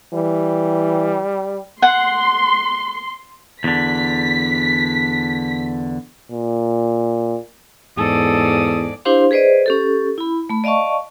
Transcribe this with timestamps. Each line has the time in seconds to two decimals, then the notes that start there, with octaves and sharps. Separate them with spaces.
0.14 E3 G3
1.82 F#5 C6
3.64 E2 D3 B6
6.32 A#2
7.98 E2 G#2 A4 D5 D#6
9.05 D4 E4 G4 C5 F5 C6
9.31 G#4 B4 C5 D5 D#5
9.66 C#4 G4 A4
10.18 E4 B5
10.49 A3 B5
10.64 D5 D#5 F5 A5 C#6